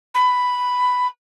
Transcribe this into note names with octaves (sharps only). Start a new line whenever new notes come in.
B5